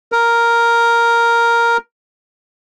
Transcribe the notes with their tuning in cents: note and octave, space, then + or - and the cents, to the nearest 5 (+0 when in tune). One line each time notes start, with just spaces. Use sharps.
A#4 +0